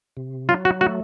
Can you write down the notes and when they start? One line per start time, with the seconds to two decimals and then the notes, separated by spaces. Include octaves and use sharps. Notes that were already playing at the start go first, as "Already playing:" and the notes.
0.17 C3
0.49 F#3 F4
0.65 F#4
0.81 A3 F#4